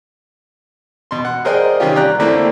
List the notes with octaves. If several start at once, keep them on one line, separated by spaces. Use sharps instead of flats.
B2 C6
F#5
G#4 A#4 C5 D5 D#5 G5
C3 D#3 G3 C#4 F4 G4
D5 G5 A#5 F#6
D3 A3 A#3 C4 D4 E4